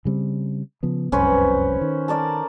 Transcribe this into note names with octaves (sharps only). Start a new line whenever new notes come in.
C#3 G3 C4
C#3 F3 B3
F1 C2 F#2 C#4 B4 C5
D#3
A4 A#4 D5